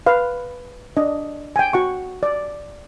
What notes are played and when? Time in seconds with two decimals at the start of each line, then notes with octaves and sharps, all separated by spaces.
0.06 B4 F5
0.97 D4 D#5
1.56 G5 G#5
1.73 F#4 F#5 C#6
2.23 D5